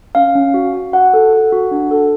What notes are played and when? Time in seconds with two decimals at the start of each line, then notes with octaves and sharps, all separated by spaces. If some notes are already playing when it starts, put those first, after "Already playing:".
0.15 C#4 F5
0.35 C#4
0.54 F#4
0.73 F#4
0.93 F#4 F#5
1.14 A4
1.33 A4
1.52 F#4
1.71 D4
1.91 A4